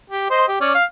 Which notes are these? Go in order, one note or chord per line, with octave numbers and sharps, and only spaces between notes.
G4
C5 D#5
G4
C#4 D5
F5